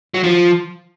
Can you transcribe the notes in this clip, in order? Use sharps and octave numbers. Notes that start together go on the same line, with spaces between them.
F#3
F3